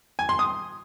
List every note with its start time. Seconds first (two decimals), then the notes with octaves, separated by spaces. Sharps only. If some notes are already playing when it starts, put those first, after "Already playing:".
0.19 G#5
0.29 C6
0.39 D#6